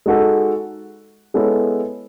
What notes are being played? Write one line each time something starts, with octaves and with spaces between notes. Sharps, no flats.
G#3 D#4 F#4 A4
G#3 B3 E4 A4 C#5